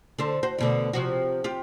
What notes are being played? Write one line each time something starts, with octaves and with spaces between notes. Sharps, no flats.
D3 A4 C5
F#4 C5
D2 B2 D3
C3 F3 F#4
F4 G4